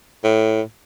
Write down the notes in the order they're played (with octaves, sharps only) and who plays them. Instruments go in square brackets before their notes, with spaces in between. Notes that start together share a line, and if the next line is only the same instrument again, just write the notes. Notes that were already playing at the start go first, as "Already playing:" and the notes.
[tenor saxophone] A2